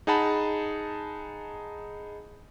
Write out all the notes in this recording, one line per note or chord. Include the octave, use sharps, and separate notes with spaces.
D#4 G#4 F#5 A5 B5